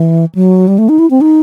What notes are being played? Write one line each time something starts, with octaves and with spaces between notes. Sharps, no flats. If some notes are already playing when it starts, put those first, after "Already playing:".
Already playing: E3
F#3
G3
A3
D#4
E4
C4
D#4